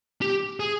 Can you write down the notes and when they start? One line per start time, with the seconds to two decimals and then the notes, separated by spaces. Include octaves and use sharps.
0.21 G4
0.60 G#4